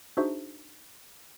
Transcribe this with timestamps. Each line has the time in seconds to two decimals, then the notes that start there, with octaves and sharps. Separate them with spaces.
0.17 D4 D#4 F#4 G#4 C5 E5